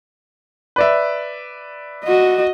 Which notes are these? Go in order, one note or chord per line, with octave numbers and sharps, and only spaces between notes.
B4 D5 E5
F#4 D#5